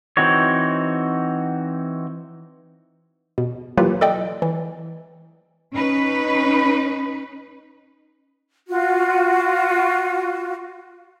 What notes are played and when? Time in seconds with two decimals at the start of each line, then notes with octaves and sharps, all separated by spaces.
0.17 E3 C4 D#4 F#4 C#5
3.38 B2
3.78 E3 F#3 A#3 F4 G4 B4
4.01 A4 D5 D#5 G5
4.42 E3
5.73 C#4 D#4 B4
8.69 F4 F#4